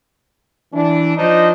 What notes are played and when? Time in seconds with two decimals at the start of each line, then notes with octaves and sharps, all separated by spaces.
0.73 E3 D4
1.17 F3 D4 D#4 C5 D#5